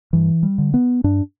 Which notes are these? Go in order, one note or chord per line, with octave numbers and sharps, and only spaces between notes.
G2 E3
G3
D3
B3
G2 D4